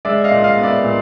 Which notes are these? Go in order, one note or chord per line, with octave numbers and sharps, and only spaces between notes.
G#3 D5 E5
D#5 F5
A#2
D#5 F5
B3
D5 E5
A#2